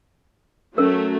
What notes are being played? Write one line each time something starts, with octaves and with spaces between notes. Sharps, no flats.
F#3 A3 C#4 A#4